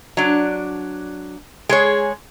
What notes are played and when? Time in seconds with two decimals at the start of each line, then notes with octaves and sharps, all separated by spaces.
0.17 F#3 D4
1.69 G#3 G#4 C#5